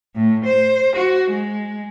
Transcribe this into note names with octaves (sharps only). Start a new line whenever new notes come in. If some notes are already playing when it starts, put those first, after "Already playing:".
A2
C5
F#4
G#3